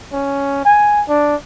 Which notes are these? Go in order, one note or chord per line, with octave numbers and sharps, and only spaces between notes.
C#4
G#5
D4